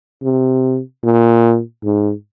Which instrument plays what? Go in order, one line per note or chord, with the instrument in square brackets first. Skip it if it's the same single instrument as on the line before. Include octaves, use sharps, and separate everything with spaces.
[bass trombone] C3
A#2
G#2